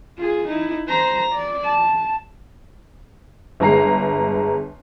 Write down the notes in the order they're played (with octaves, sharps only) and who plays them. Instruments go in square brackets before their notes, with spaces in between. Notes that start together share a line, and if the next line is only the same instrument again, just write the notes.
[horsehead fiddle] F4 G#4
D#4 E4
C5 A#5
D5
A5
[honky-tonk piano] G1 G#3 A#5 C7